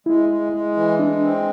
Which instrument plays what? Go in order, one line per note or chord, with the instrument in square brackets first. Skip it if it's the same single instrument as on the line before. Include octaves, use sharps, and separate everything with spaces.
[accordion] G#3 [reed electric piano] E4
[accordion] G#3
G#3
E3
[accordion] G#3 [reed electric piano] D4
[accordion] C4